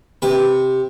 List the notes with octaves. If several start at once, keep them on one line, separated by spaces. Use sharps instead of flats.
C3 B4